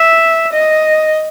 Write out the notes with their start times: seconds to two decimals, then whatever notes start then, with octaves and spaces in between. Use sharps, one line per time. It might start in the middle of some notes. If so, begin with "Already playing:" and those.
Already playing: E5
0.53 D#5